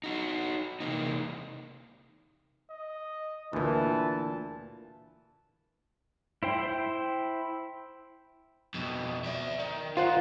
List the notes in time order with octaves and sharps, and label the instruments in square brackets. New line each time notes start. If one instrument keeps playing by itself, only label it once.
[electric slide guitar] D#4 F#4
C3 E3 A#3 D#4
[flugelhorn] D#5
[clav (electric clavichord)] D2 A#2 [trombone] E3 [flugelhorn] A5
[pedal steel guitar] E4 C5 G5
[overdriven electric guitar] F2 B2
D5 E5
D#3
[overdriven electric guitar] D#3 [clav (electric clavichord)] F4 C5 F#5